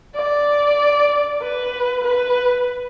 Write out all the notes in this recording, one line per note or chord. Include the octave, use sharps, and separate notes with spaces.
D5
B4
B4